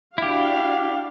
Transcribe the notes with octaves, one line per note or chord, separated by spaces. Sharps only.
D4 E4 F#4 G4 F5